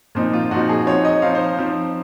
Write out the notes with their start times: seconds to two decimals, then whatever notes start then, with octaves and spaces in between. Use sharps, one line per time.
0.15 A#2 F3 C4 D#4
0.33 F4
0.51 A#2 F3 C4 D#4 F#4
0.69 G#4
0.87 F3 C4 D#4 C#5
1.05 D#5
1.22 F3 C4 D#4 F5
1.35 C5
1.58 F3 C4 D#4